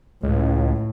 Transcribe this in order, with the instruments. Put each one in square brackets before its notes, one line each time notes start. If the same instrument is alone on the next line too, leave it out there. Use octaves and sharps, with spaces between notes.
[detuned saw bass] C#2 [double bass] A2